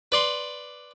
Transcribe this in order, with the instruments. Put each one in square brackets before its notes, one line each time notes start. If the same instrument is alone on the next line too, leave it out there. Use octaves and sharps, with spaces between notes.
[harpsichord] B4 D5 C6